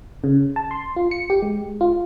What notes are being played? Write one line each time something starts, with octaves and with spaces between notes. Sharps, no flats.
C#3
A5
C6
F4
C#7
G4
G#3
F4